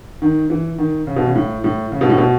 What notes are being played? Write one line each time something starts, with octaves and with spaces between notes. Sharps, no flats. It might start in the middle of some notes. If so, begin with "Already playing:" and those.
D#3
E3
D#3
C#3
B2
C#3
A2
A2
C#3
B2
A2
B2